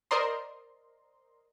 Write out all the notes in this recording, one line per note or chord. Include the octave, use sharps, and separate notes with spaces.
A#4 C5 D5 D#5 A#5 C6